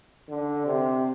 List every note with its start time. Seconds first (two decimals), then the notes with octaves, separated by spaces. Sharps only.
0.29 D3
0.66 C3